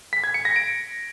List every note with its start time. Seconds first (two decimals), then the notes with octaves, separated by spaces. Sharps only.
0.13 B6
0.24 G#6
0.34 C#7
0.45 A#6
0.56 D7